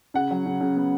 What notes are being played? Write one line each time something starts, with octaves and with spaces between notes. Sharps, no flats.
C#3 F#5
F#3
C#3
C#3
B3